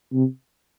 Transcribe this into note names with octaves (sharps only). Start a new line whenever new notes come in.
C3